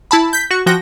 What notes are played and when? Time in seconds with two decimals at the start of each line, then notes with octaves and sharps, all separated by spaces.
0.11 E4 A5 B5
0.33 G6 B6
0.51 F#4 C#6
0.66 F3 F#4 G5 A#6